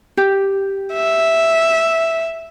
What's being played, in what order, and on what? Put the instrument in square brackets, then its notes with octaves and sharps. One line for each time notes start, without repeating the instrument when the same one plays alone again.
[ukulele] G4
[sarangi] E5